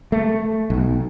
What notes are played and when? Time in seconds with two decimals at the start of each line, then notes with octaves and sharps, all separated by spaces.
0.12 A3
0.70 B1